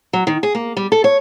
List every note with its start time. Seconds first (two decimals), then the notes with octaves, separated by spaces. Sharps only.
0.13 F#3
0.27 D#3
0.43 G#4
0.55 A#3
0.77 G3
0.92 A4
1.04 C#5